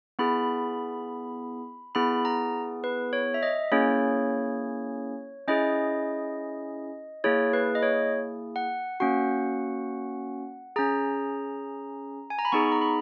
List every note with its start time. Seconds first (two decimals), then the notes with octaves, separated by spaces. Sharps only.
0.19 B3 E4 G#4 B5
1.95 B3 E4 G#4 B5
2.25 A#5
2.84 B4
3.13 C#5
3.34 E5
3.43 D#5
3.72 A#3 C#4 E4 G#4 C#5
5.48 C#4 E4 G#4 D#5
7.24 A#3 E4 G#4 C#5
7.53 B4
7.75 D#5
7.83 C#5
8.56 F#5
9.00 A#3 C#4 F#4 F#5
10.76 C#4 G#4 A#5
12.30 G#5
12.39 A#5
12.45 B5
12.52 B3 D#4 G#4 C#6
12.72 A#5
12.82 B5